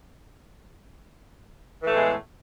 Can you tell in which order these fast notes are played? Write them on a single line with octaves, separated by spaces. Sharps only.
E3 A3 A2 E2 G#3